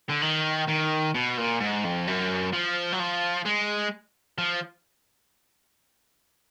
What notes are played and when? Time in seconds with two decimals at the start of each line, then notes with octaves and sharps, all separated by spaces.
0.09 D3
0.22 D#3
0.68 D#3
1.14 B2
1.37 A#2
1.60 G#2
1.84 F2
2.07 F#2
2.53 F3
2.93 F#3
2.99 F3
3.45 G#3
4.38 F3